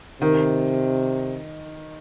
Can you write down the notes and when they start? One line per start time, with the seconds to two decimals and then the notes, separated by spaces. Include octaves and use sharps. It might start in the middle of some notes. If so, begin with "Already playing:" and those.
0.21 C3 D#3